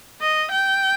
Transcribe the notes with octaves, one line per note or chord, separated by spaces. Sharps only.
D#5
G5